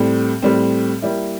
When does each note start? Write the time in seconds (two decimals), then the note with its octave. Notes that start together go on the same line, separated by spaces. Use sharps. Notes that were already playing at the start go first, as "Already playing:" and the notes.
Already playing: A2 G3 C4
0.42 A2 G3 C4
1.02 G3 A#3 E4